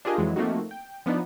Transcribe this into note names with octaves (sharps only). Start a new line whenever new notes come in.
D4 F4 G4 G#4 A#4 D#5
F2 E3 F#3 G#3
F3 A3 A#3 C4 D#4 F#4
G5
F3 B3 D4 D#4